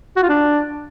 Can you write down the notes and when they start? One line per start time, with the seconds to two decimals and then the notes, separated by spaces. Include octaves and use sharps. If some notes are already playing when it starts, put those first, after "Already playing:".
0.16 F#4
0.23 F4
0.29 D4